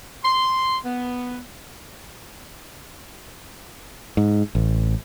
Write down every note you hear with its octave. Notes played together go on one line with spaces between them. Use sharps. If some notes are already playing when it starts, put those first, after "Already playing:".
C6
B3
G#2
A1